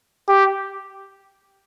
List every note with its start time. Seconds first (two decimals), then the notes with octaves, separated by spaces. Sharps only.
0.28 G4